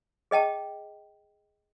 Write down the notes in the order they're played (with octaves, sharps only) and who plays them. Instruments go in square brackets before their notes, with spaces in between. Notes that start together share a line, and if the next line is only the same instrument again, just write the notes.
[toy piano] G#4 D#5 G5 A5